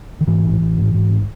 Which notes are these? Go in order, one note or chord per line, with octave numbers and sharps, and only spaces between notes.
D#3
G#2 E3
A1
A1
G#2
G#2
A1